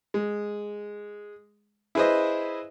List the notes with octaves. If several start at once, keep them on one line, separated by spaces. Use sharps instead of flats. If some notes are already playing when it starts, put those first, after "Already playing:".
G#3
E4 G#4 B4 C5 D#5